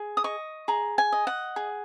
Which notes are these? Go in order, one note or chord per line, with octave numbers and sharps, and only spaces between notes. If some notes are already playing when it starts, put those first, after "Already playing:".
Already playing: G#4
D#6
D#5 C#6
G#4 A#5
G#5
D#5
F#5
G#4